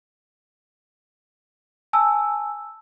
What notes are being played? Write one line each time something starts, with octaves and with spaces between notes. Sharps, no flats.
G#5 A5 E6